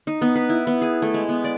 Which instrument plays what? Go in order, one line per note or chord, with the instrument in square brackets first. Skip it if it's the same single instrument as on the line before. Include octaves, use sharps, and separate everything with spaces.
[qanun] D#4
B3
B4
E4
B3
G#4
A3
G#3
B3
D5